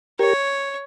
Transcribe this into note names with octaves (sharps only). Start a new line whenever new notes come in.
G4 A#4 C#5